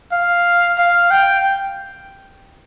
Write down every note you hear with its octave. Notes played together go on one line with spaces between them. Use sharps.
F5
F5
G5